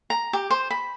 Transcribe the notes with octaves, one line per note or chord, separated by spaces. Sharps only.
A#5
G4
C5
B5